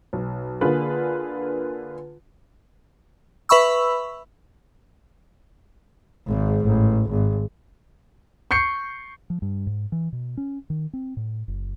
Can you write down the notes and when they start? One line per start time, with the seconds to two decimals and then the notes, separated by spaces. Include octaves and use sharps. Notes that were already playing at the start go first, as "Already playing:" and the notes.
0.13 B1
0.61 D3 A#3 F4 G#4 B4
3.49 B4 E5 B5 C#6 E6
6.28 G#1 G#2
6.66 A1
7.10 G#1
8.51 C#6 G6 C7 C#7
9.30 F3
9.42 G2
9.67 G#2
9.92 E3
10.13 B2
10.37 C#4
10.70 D#3
10.93 C4
11.17 A2
11.48 F#1